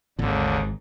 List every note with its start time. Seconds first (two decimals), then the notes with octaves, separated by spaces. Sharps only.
0.19 G#1 D#2 G#2 D3